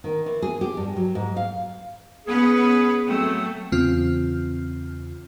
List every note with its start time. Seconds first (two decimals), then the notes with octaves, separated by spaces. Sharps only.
0.04 D#3
0.26 E3
0.42 G#4
0.61 G4
0.77 G2
0.96 F#3
1.15 G#2
1.36 F5
2.27 B3 C#4 G#4 B4
3.07 F#3 A3 C4
3.72 E2 C#3 C4 F4 F6